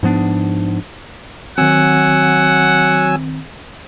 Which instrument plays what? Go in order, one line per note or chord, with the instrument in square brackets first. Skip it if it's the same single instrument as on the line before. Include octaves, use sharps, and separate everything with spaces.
[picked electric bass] G#2 F3 B3 D4
[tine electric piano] D#3 C4 [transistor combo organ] F#3 G#5 E6 [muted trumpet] F#5